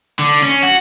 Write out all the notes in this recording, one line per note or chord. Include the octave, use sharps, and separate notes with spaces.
D3
C#4
F#4